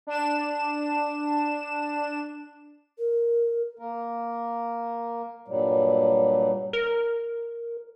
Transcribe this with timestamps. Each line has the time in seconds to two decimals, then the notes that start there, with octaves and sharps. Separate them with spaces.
0.07 D4 E7
2.98 A#4
3.79 A#3 A#4
5.48 G2 A#2 F#3 G3
6.73 A#4